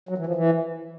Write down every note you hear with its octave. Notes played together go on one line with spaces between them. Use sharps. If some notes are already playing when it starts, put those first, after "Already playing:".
F#3
E3
F3
E3